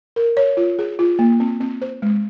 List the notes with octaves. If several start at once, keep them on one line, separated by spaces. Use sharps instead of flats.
A#4
C#5
F4
G#4
F4
A#3
C4
C4
C5
G#3